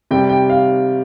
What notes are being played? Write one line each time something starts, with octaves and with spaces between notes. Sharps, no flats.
C3 G3 G5
G5
F5